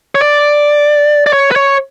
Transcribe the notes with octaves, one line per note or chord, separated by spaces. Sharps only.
C#5
D5
D5
C#5
B4
C#5